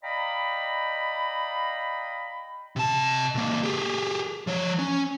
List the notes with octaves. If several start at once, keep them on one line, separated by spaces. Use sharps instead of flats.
D5 D#5 F5 G5 A#5 B5
C3 A5
C#2 A#3
G4 G#4
F3 C#5
C#4